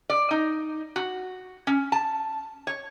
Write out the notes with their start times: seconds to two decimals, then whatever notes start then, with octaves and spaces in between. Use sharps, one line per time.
0.10 D5
0.31 D#4
0.96 F#4
1.67 C#4
1.92 A5
2.67 C#5